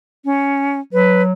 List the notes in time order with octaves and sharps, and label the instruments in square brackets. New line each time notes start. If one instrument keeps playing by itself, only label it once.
[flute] C#4
[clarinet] F#3 [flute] B4